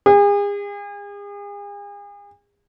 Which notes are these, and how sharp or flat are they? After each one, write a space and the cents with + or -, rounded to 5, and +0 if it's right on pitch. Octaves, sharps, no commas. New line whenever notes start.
G#4 -40